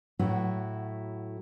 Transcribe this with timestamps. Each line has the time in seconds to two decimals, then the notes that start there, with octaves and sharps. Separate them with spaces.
0.19 A2 F#3 A3 E4 F#4 F#5